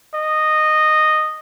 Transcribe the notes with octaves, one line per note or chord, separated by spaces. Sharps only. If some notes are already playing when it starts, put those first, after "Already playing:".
D#5